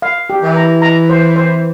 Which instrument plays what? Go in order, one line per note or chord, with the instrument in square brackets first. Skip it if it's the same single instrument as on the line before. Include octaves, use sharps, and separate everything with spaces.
[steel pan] F5
G4
[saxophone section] E3
[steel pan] A#5
A#5
C5
C5